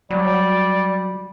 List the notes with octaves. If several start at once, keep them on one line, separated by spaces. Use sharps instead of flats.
F#3 G3 D5